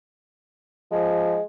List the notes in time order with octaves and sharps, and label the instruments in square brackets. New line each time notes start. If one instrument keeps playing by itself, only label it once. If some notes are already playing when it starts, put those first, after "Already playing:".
[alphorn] F3 [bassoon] G#3